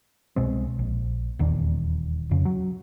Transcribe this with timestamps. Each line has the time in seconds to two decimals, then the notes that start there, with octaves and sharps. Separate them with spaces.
0.36 C2 B2 G#3 C4
0.79 A#1
1.39 D#1 E2 D#3 D4
2.31 F2 C#3
2.45 F#3